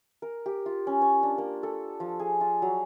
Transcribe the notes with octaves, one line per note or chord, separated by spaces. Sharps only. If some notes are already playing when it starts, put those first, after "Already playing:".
A#4
G4
F4
C#4
C#5
D4
A#3
A4
F3
G#4
F4
F#3